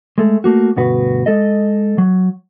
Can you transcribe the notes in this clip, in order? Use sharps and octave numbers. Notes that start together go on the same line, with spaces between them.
G#3 A3
A3 A#3 F#4
D2 G2 B2 F#4 B4
G#3 A4 D#5
F#3